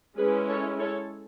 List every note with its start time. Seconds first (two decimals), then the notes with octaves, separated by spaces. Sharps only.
0.17 G#3 C#4 E4 G#4 B4
0.48 A4 C#5
0.79 A4 C#5